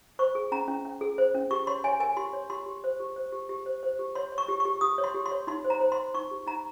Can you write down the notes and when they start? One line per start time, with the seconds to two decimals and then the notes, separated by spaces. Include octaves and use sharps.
0.19 C5 C#6
0.35 G#4
0.52 C#4 A#5
0.68 C#4
0.85 C#4
1.01 G#4
1.18 C5
1.35 C#4
1.51 G4 C#6
1.67 C#5 C6
1.84 C#5 G#5
2.00 A#4 G#5
2.17 G4 C6
2.33 C#5
2.50 G4 C6
2.66 G4
2.84 C5
3.00 G4
3.16 C5
3.32 G4
3.49 G4
3.66 C5
3.83 C5
3.99 G4
4.15 C#5 C6
4.32 C#5
4.38 C#6
4.48 G4
4.60 C#6
4.65 G4
4.81 G4 D#6
4.98 C#5
5.04 C6
5.14 G4
5.26 C6
5.32 C#5
5.47 D#4 C6
5.65 C5
5.70 A#5
5.80 C5
5.92 C6
5.98 C5
6.14 D#4 C#6
6.31 G4
6.47 D#4 A#5